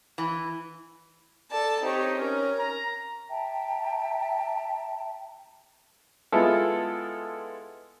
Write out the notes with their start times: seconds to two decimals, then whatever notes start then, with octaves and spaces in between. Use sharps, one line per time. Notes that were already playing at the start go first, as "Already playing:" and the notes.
0.18 E3
1.50 A4 D5 A5
1.82 C4 D#4 G4 C#5
2.18 C#4 A#4
2.59 A#5
3.29 E5 G5 A5 A#5
6.32 G#3 B3 E4 F4 A4